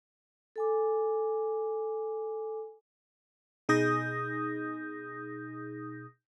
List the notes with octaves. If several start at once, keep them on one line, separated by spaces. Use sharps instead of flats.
A4 G#5 D6
B2 D#4 G#4 D#6 G6 A#6